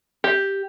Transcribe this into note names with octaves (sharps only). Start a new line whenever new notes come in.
G4